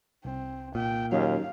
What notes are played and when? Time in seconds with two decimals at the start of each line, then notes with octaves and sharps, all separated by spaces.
0.25 C2 C4
0.75 A#2 G5
1.12 D#2 F#3 C#4 D#4 F5